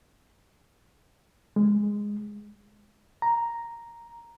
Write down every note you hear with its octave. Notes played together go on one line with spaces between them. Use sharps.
G#3
A#5